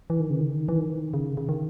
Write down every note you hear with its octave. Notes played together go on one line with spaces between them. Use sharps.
E3
D#3
C#3
D#3
E3
D#3
C#3
C#3
D#3